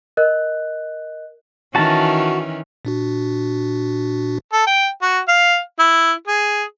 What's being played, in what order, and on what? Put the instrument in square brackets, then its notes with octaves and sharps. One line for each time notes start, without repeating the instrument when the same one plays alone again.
[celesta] A#4 D#5 F#6
[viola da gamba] D#3 E3 C#4 [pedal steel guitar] F#4 A5
[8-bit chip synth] A#2 D4 F#4
[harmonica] A4
G5
F#4
F5
E4
G#4